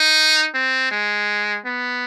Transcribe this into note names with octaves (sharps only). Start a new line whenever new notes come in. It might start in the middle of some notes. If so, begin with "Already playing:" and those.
Already playing: D#4
C4
G#3
B3